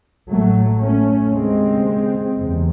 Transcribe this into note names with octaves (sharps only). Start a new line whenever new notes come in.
A1 A2 F#3 A3
A3 C#4
D#2 C#3 G#3 C4
F#1 E2 C3